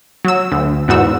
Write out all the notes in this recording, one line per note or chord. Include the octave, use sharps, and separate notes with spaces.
F#3 E6
D2
E2 G#2 F#4 E6